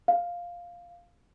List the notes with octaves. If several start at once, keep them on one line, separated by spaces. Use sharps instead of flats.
F5